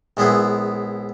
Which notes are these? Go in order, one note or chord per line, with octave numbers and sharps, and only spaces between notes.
A#1 G#3 B3 E4 G#4